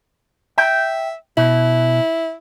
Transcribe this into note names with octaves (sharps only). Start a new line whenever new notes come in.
E5 G5
B2 E4